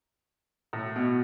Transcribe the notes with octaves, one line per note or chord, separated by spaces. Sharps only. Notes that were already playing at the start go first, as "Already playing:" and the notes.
A2
B2